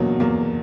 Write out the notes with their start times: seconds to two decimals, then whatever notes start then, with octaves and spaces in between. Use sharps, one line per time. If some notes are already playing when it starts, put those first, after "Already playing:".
Already playing: E2 B2 F#3 A#3 D4
0.20 E2 A#3